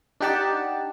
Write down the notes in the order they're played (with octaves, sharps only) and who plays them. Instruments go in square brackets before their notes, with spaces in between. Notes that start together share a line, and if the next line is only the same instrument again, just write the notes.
[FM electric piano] D4 D#4 G4 F#5 A5